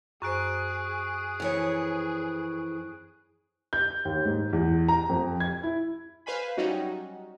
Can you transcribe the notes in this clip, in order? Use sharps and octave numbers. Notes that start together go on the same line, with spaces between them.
F#2 G#4 C5 C#6 F#6 D7
F2 E3 C#5
G6
D#2
G#2
E2
A#5
F2
G#6
E4
B4 C5 F5 G#5 B5
F#3 G3 C#4 D#4 F#4